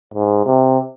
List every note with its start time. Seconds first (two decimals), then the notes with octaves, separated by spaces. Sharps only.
0.14 G#2
0.46 C3